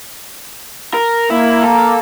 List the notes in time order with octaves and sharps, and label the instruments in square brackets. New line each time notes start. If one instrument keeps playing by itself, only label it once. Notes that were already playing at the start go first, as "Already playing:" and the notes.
[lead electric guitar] A#4
[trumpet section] A#3 [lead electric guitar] E4
[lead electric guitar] A4 [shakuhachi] A#5